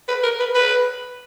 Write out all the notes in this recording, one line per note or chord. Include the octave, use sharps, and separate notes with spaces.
B4
A#4
B4
B4